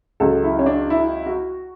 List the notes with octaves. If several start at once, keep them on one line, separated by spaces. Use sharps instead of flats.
C#2 C#3 F#3 A4
E4
C#4
D4
E4
F#4